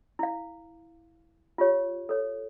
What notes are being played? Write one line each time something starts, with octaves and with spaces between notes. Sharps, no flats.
E4 F5
F4 G4 C#5
A4 C#5